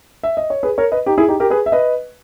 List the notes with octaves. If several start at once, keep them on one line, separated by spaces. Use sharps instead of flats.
E5
D#5
C#5
G#4 B4
A#4 C#5
B4 D#5
D#4 G4
E4 G#4
D#4 G4
G4 A#4
G#4 B4
E5
B4 D#5